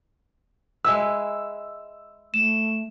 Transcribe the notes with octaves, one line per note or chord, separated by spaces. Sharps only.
G#3 E4 B4 E6
A3 E7